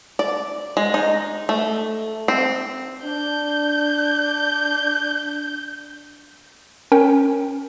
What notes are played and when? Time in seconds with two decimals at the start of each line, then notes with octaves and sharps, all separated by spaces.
0.19 D5
0.77 G#3
0.94 D#4
1.49 A3
2.28 C4
3.05 D4 G6
6.92 C#4 A#4 G5